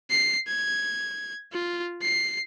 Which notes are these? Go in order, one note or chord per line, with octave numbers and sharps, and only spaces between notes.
C7
G#6
F4
C7